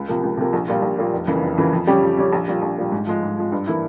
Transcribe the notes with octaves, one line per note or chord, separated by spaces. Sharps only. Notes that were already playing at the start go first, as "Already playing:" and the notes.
Already playing: C#2
C3 F3 A#3
C#2
C3 F3 A#3
A#1
A#2 G3 A#3 F4
A#1
A#2 G3 A#3 F4
F1
F2 C#3 E3 A#3
F1
F2 C#3 E3 A#3
F2
C#3 G3 C#4 G4
F2
C#3 G3 C#4 G4
A#1
A#2 G3
A#1
A#2 G3
G#2
F3 G#3
G#2
F3 G#3
G2
E3 A#3 E4